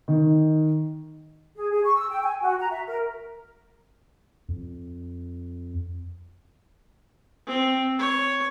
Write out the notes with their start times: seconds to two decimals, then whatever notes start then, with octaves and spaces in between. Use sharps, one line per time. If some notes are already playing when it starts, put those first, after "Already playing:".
0.08 D#3
1.56 G#4
1.70 G#4
1.84 C#6
1.97 E6
2.10 G5
2.22 G#5
2.41 F#4
2.59 A#5
2.71 E5
2.87 A#4
4.49 F2
7.47 C4
7.99 C#5